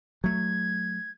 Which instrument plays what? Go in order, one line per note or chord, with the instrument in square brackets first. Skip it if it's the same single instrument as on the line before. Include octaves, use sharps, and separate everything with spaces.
[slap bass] F#3 A3 [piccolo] G#6